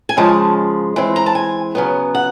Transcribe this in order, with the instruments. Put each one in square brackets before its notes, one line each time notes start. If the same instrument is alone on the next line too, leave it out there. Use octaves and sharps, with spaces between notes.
[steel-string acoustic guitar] G#5
C#3 F3 G#3 A5
E3 G#3 C4
A#5
A5
G#5
C#3 F#3 B3
F#5